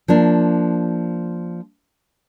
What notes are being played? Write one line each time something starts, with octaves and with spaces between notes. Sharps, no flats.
F3 A#3 D4